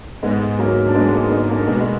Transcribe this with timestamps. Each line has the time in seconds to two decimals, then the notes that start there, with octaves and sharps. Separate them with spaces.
0.23 G#2 G#3 B3
0.59 F#3 A#3
0.88 D4
0.95 G#3 B3
1.13 A#3 D4
1.31 B3 D#4
1.49 A#3 D4
1.67 B2 G#3 B3
1.80 G#3